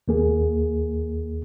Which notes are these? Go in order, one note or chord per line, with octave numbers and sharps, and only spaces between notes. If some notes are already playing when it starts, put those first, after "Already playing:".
D#2 A#3 G#4